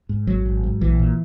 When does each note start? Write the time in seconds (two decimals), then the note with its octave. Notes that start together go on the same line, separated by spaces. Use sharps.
0.09 G#2
0.27 G#1 F#3
0.46 G#1
0.63 G#2
0.81 A#1 E3
0.99 A#2